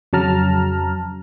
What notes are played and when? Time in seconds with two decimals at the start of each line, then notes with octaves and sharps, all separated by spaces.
0.13 F2 C#3 F#3 A5 A#5 F6